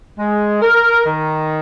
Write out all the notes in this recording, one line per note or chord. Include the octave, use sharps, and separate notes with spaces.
G#3
A#4
D#3